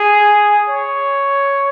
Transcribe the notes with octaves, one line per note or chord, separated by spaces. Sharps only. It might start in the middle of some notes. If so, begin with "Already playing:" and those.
Already playing: G#4
C#5